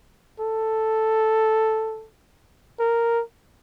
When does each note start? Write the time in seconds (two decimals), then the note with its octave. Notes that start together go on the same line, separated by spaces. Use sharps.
0.40 A4
2.80 A#4